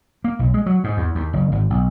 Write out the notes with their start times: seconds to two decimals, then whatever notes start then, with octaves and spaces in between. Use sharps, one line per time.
0.24 A#3
0.39 B1
0.54 G#3
0.66 F#3
0.84 G#2
0.97 E2
1.15 D#2
1.33 F#1
1.52 G#1
1.70 B1